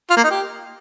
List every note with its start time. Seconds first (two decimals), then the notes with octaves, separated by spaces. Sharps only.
0.10 F4
0.17 A#3
0.24 D#4
0.31 G4